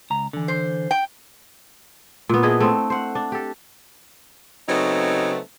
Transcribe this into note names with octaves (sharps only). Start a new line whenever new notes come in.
C#2 A#5
D3 E3
C5
G5
A#2 B3
D4 E4 G#4 D#5
A3 C4
C5 F#5
D4
G4 A4
C#3 F#3 A3 B3 C4 D#4